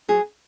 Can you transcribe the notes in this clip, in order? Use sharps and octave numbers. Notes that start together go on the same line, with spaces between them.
F#3 G#4